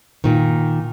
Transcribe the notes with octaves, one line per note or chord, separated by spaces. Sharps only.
A#2 D#3